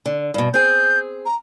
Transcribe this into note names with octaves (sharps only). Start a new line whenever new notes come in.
D3
G2 B2
C4 G#4 G6
A#5